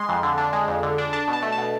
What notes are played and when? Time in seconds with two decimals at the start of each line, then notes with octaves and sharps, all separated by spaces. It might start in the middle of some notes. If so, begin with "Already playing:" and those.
Already playing: G#3 C6
0.09 F2
0.23 D3
0.38 D4
0.53 G#3
0.68 F2
0.83 D3
0.98 D4
1.13 D4 A5
1.28 B2
1.33 A5
1.43 A3
1.52 A5
1.58 B2